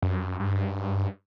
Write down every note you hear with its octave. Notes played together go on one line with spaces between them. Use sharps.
F#2
G2